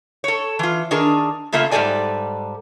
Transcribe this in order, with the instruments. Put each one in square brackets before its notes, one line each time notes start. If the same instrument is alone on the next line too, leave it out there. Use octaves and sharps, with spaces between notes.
[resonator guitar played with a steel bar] A4 C#5
E3 F4
D#3 D4 G#4 A#4
C#3 A3 A#3 F4 E5
G#2 G3 F4 A4 D5 G#5